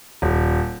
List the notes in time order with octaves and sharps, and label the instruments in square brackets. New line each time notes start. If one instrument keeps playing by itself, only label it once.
[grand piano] D#1